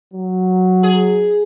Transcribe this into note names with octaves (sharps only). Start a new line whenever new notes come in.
F#3
G#4